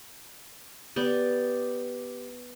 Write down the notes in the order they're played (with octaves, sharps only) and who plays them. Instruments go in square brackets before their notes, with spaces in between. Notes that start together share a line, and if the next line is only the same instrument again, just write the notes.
[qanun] B3 G4 D5